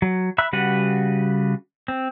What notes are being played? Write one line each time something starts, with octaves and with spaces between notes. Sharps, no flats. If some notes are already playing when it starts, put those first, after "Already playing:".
F#3
E5 B5 E6 F#6
C#3 G3 F#4 B4 F#5
C4